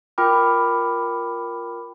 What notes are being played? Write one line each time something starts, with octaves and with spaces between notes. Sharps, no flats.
F4 A#4 G5 B5 D6 F6